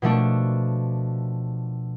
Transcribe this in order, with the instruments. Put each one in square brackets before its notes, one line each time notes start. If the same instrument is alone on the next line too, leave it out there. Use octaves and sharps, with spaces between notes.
[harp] B2 F3 A3 D4